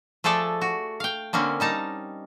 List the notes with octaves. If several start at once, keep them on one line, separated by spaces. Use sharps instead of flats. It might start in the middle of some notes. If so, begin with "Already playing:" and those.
F3 A3 G#4 A4 D5
F#4
F5 G5
D3 A#3 C4 C#4
G3 D#4 A5 A#5